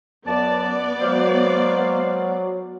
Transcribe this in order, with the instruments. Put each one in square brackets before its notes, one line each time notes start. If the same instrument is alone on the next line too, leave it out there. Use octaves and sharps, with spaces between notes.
[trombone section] F#2 [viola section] B3 D5 [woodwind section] A5
[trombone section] F#3 [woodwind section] G#3 C5 F5